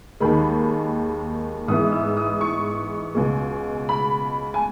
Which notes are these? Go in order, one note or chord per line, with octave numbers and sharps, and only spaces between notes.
D#2 D#3 G#3 B5
G#2 E3 G#3 B3 E4 D#6
E6
D#6
C#6
C#2 B2 G#3
B5
G#5